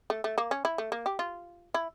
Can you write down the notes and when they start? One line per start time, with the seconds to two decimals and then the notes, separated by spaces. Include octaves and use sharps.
0.10 A3
0.24 A3
0.38 A#3
0.51 C#4
0.65 E4
0.78 A3
0.92 A#3
1.06 G4
1.19 F4
1.74 E4